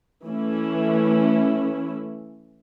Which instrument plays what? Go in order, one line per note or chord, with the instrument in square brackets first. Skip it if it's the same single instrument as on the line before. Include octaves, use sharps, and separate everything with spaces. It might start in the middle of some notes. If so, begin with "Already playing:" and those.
[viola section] E3 A3 C#4 E4